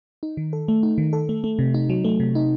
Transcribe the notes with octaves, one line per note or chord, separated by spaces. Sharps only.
D#4
D#3
A4
A3
D#4
D#3
A4
A3
A3
C3
D#4
F#3
A3
C3
D#4